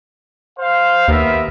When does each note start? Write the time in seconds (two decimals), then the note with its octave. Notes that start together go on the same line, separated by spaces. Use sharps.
0.58 C5 F5
1.08 D#2 B3 A#4 E5